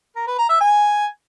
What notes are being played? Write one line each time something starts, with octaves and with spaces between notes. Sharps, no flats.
A#4
B4
A#5
E5
G#5